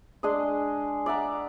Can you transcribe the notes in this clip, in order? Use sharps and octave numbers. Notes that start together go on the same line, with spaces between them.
G#3 D4 G#4 D#5
D5 E5 F#5 A#5